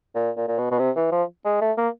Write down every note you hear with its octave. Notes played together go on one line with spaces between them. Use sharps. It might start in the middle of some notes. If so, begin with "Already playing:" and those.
A#2
A#2
A#2
B2
B2
C3
E3
F3
G#3
A3
A#3